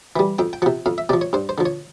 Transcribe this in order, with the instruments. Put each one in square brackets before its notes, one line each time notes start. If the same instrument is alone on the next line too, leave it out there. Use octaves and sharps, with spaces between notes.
[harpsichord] E3 G3
F2 G5
G5
C3 F3 F#5
F2 F5
E5
C3 F3 D5
C#5
G2 C5
C5
D3 F3
C#5